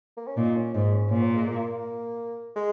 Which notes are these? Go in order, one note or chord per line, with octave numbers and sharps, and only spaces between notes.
A#3
C#4
A#2 D#4
C#4
G#2 D#4
C#4
A#2 C#4
A#3
G#3
A#3
G#3